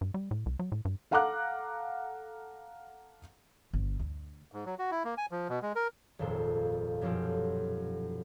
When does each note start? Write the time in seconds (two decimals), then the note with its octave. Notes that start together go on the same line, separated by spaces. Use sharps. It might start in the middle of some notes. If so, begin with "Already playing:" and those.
0.01 G2
0.14 G3
0.31 A2
0.46 C2
0.59 F#3
0.72 A2
0.85 G2
1.11 A4 F5 F#5 A#5 D6 F#6
3.73 G1
3.99 D2
4.52 G#2
4.66 F#3
4.79 F#4
4.91 E4
5.05 A#3
5.18 G#5
5.31 F3
5.49 B2
5.62 G#3
5.76 A#4
6.19 D#1 G#1 F2 A#2 A4 C5
7.01 F#2 B2 F3 F4 G4 A4